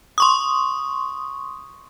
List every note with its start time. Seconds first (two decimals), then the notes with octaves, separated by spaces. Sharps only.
0.18 C6 C#6 D#6